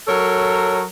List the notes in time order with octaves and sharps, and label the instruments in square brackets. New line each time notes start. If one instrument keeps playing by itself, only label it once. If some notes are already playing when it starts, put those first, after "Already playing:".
[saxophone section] F#3 A4 A#4 C#5